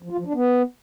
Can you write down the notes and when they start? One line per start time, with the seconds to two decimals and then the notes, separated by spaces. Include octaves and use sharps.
0.03 F3
0.11 F4
0.19 F3
0.26 D4
0.34 B3